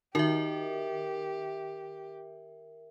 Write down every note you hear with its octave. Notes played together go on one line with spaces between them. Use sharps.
D#3 D#4 F#4 G4 A#4 E5